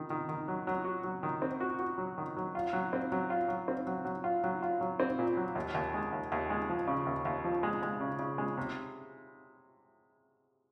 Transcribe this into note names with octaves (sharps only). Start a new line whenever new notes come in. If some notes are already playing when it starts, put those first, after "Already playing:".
Already playing: D#3
D#3
D#3
F#3
F#3
F#4
F#3
D#3
C4
F#4
F#4
F#3
D#3
F#3
F4
F#3
C4
F#3
F4
F#3
C4
F#3
F#3
F4
F#3
F4
F#3
C4
A#2
F#3
D#2
D#2
G#3
D#2
D#2
G#3
F3
C#3
D#2
D#2
F3
G#3
G#3
C#3
C#3
G#3
C3